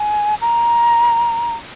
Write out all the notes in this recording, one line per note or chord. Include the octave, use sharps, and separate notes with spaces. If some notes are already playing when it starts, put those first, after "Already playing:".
Already playing: G#5
A#5